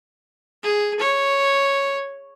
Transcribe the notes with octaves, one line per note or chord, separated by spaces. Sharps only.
G#4
C#5